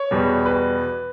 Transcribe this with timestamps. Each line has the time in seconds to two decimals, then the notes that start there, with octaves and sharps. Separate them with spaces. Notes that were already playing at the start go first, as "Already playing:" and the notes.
Already playing: C#5
0.11 E2 B2 G3
0.46 B4